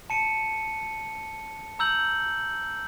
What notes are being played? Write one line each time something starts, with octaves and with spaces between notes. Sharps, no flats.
A5 C#7 D#7
A#5 E6 G6 F#7